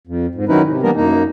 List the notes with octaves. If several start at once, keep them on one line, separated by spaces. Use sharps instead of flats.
F2
G#2
D#3 F#3 C#4 D#4 E4 B4
C3
E3 G3 A#3 B3 D4 A#4
F#2 A#3 D#4